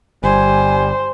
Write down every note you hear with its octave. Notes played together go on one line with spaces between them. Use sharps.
G1 G3 C5 G#5